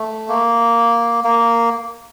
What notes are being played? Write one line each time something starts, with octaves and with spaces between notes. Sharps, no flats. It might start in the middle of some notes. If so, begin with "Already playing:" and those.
Already playing: A3
A#3
A#3